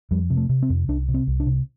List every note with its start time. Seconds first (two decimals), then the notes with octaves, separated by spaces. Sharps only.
0.11 F2 G3
0.30 C3
0.37 A3
0.49 C3
0.63 C4
0.70 F2
0.88 C2 D4
1.08 C3
1.14 C4
1.27 C2
1.40 D4
1.46 C3